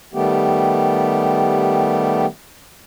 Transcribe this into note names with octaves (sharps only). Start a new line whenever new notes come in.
D#3 G3 A3 B3 G4